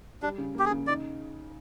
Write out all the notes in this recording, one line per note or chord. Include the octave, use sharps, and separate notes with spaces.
G3 D4
C#3
A#3 G4
G#4
C#3
D#4 D5